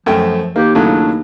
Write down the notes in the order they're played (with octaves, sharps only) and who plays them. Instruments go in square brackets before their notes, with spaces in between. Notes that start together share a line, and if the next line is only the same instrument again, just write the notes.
[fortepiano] F#2 A3 G5 [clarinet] F3
[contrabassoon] D#2 [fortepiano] A#3 [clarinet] G4
[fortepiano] A2 C#3 F#3 [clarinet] D4